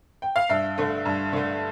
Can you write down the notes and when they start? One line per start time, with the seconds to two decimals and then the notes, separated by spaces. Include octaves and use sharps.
0.22 G5
0.36 F5
0.49 G2 E5
0.78 D3 A3
1.05 G2
1.33 D3 A3